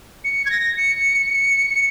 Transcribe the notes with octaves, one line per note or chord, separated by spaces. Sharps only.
C#7
G#6
A#6
C#7